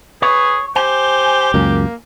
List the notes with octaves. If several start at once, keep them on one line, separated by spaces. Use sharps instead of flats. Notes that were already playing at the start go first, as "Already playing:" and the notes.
G#4 B4 C#5
G4 C5 G#5
C#2 F#2 A#3